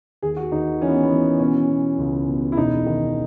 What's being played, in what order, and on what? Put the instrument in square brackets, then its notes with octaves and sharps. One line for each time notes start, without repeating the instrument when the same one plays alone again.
[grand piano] D#2 G#4
F#4
D#2 D#4
E3 C#4
B3
B3
E3
B2 C#4
B2
C#2
B2
E4
E1 D#4
D#3